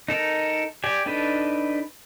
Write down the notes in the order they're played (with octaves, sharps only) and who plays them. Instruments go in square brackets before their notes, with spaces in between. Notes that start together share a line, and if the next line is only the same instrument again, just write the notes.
[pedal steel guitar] D#4 A4 A#4
G4 D5 G#5
D4 D#4 A4 B4